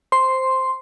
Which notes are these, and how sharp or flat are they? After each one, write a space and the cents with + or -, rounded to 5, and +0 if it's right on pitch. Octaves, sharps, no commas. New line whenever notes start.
C5 +0 C6 +0